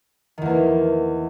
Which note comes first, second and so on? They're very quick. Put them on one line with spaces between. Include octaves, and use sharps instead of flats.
D#3 E2 A#3 E3